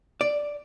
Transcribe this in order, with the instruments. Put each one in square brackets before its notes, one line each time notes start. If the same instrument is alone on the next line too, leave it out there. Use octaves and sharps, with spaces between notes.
[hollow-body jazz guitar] D5